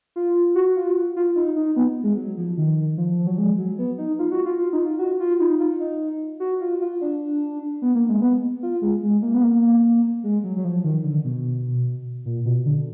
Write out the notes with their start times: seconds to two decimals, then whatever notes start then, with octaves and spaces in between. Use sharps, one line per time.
0.16 F4
0.55 F#4
0.76 F4
1.16 F4
1.36 D#4
1.56 D#4
1.76 B3
2.03 G#3
2.17 F#3
2.37 F3
2.57 D#3
2.98 F3
3.27 F#3
3.38 G#3
3.58 F#3
3.78 B3
3.98 D#4
4.19 F4
4.31 F#4
4.46 F4
4.58 F4
4.73 D#4
4.86 F4
4.99 F#4
5.20 F4
5.40 D#4
5.60 F4
5.80 D#4
6.40 F#4
6.61 F4
6.81 F4
7.01 D4
7.82 B3
7.95 A#3
8.09 G#3
8.22 B3
8.63 F4
8.82 G#3
9.03 G#3
9.22 A#3
9.34 B3
9.43 A#3
10.24 G#3
10.44 F#3
10.56 F#3
10.65 F3
10.84 D#3
11.04 D3
11.24 B2
12.25 A#2
12.45 B2
12.66 D3